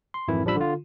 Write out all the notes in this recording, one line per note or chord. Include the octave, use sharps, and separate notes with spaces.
C6
G#1 F2 D#3 E3 E4
A1 F3 G3 D4 B5 E6
D3 F4